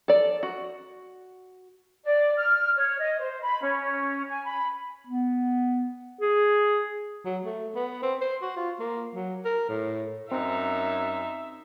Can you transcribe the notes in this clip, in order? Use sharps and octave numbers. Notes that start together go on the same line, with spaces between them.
A4 D5
F#4
D5
F6
C#5
D#5
C5
B5
C#4
G#5
B5
B3
G#4
F#3
A3
B3
C4
C5
F#4
F4
A#3
F#3
A#4
A2
F#2 C4 D#4 E5